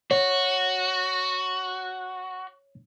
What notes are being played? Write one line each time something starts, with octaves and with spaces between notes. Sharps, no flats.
F#4 C#5